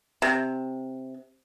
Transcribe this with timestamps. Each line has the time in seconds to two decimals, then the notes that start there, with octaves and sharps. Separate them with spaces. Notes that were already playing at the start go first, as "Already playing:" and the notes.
0.22 C3